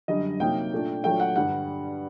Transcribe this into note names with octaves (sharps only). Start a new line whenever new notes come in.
F#2 D3 G3 D4 D#5
C3 F#3 A#3 D#4 G5
A#2 A3 D4
A#2 F#3 A3 D4 G5
F#5
G2 D3 G3 F#5